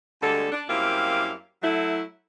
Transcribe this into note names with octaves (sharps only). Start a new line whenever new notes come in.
D2 D3 G3 G#3 A4
D4
F#2 G3 A#3 C4 E4 F5
F#3 A3 E4